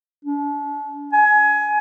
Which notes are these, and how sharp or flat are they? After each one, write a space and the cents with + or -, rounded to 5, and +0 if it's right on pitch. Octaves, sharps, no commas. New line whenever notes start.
D4 -35
G#5 +20